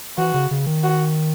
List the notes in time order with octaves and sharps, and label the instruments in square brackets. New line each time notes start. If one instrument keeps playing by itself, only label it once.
[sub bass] E3 [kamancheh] F#4
[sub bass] C#3
C#3
D#3
[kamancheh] F#4